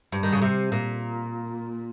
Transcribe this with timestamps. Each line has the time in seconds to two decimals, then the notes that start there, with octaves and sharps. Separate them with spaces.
0.12 G2
0.23 D#3
0.33 C#3
0.42 C3
0.72 A#2